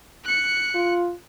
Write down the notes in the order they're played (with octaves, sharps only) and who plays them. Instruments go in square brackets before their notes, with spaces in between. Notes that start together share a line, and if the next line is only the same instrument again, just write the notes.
[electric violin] F#6 C#7
[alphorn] F4